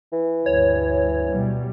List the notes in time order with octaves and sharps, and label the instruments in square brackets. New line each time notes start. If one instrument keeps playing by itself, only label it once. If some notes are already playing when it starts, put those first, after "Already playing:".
[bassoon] E3
[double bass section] D2 G2 [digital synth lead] C#5
[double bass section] B2 F#3 G3